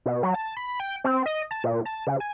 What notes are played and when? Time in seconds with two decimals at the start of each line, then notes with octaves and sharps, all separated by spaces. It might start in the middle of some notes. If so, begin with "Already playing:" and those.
0.06 B2
0.23 F#3
0.35 A5
0.57 B5
0.80 G5
1.04 C4
1.26 D#5
1.51 A5
1.64 A#2
1.85 A5
2.07 C#3
2.20 G#5